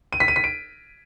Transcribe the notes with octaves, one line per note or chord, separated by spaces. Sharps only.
D#7
B6
D#7
B6
D7